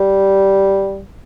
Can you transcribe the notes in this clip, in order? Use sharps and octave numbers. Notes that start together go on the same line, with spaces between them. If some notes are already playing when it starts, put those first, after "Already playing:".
Already playing: G3